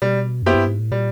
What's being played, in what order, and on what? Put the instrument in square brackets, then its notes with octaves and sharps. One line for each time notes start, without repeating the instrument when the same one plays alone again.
[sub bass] B2 [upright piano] G3
[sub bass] F#2 [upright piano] B3 E4 G4 C5
[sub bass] G2
G#2
A2
[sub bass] A#2 [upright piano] G3